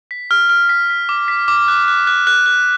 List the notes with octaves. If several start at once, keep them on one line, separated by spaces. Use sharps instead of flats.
B6
F6
F6
B6
B6
D6
B6
D6
F#6
F#6
F#6
F#6
F#6